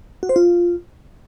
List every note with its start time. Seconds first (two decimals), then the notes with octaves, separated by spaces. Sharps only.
0.23 F#4
0.29 C5
0.36 F4